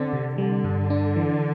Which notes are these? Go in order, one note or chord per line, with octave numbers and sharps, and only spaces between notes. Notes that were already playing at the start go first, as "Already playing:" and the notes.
Already playing: D3 C4
C3
D3 G3
G2
D4
E3